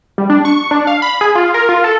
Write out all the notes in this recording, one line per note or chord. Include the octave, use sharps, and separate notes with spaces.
G3
D4
C#6
D4
F5
B5
G#4
F4
A#4
F4
A4